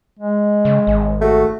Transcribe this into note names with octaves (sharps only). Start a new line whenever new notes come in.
G#3
C#3
G#1
A3 F#4